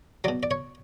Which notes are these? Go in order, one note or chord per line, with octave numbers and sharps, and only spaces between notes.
B2 F#3 D5
D5
C#5